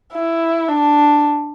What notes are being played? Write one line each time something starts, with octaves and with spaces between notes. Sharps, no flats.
E4
D4